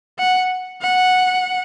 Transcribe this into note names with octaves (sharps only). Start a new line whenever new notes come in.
F#5
F#5